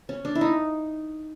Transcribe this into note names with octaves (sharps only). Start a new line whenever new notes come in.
C#4
D4
E4
D#4